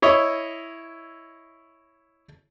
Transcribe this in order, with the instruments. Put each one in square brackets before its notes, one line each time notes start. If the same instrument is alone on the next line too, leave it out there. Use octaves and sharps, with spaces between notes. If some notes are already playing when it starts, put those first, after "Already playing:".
[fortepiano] E4 C#5 D#5 E5